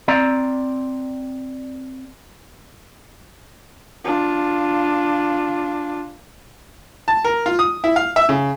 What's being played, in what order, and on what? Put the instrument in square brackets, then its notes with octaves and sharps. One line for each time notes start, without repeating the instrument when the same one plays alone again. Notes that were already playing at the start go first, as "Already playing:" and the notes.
[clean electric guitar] C4 D5 A#5
[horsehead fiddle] D4 F4
[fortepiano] A5
A#4
F4
D#6
E4
F5
E5
C#3